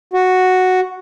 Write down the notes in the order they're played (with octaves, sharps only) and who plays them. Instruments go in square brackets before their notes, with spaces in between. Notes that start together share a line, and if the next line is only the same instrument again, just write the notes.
[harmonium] F#4